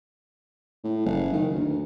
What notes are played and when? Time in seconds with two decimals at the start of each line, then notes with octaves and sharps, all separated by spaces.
0.84 A2
1.05 F#1
1.33 D#3
1.55 D2